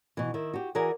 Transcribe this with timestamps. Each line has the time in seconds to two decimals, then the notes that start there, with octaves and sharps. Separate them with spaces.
0.17 B2 E3
0.34 D#3 E4
0.54 F#4 G4
0.75 E3 F#4 G#4 A#4 D5